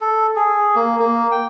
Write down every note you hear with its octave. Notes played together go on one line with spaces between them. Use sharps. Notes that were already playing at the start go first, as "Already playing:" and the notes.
A4
G#4
A#3
A#3
G5